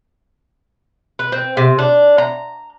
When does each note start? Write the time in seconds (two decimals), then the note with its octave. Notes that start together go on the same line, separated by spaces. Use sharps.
1.19 B4
1.32 C4
1.57 C3
1.79 D4
2.18 A#5